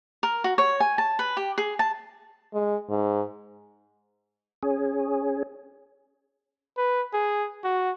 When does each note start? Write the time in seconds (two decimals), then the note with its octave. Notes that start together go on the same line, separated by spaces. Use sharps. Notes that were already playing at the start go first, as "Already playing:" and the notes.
0.23 A#4
0.44 F#4
0.58 C#5
0.80 G#5
0.98 A5
1.19 B4
1.37 G4
1.58 G#4
1.79 A5
2.54 G#3
2.89 G#2
4.63 C#4 G#4
6.77 B4
7.13 G#4
7.64 F#4